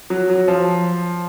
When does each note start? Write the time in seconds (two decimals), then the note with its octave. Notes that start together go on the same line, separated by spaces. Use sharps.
0.10 F#3
0.30 F#3
0.48 F3